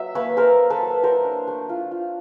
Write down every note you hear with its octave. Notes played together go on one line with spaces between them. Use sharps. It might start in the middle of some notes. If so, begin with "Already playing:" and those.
Already playing: F#3 E5
A#3 B4 C#5
A#3 A#4 C5
A#3
A4 B4
F#3
F#3 A#4 C5
D4
A3
F4
F4